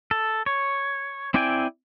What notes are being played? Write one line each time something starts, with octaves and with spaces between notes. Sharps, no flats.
A4
C#5
C4 E4 D5 G5 G#5